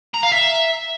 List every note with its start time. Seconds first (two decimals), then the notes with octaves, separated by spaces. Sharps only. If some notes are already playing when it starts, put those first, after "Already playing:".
0.14 A#5
0.23 F5
0.32 E5